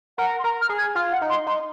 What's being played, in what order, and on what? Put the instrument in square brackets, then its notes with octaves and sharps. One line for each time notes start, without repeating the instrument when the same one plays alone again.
[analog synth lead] A#4 [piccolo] F#5
[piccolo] C6
[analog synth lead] A#4 [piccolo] A#5
[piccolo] F6
[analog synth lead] G#4
[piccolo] G#6
[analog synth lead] F4 [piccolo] F6
[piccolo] F#5
[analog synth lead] D#4
[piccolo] C6
[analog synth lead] D#4 [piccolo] C6